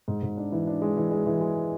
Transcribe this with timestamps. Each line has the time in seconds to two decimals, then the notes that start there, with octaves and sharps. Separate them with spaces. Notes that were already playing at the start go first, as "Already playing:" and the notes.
0.08 G#2
0.23 G#2
0.37 D4
0.52 E3
0.67 D4
0.82 G#3
0.97 E3
1.11 G#3
1.26 E3
1.41 G#3